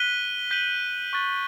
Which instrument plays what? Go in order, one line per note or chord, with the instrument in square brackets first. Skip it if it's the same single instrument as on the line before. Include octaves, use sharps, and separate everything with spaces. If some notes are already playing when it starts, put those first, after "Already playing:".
Already playing: [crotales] F#6 B6 D#7 G7
G6 B6 D#7 F#7
C#6 F#6 A6